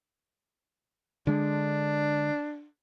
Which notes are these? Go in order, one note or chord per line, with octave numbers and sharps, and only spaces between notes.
D3 G#3 D4